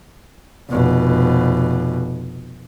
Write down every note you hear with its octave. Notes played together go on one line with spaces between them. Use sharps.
F1 B2